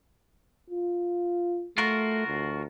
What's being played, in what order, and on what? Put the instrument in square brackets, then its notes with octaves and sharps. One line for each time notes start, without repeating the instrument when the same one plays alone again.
[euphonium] F4
[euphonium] A3 [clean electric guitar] F4 F#4 A#4
[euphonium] D2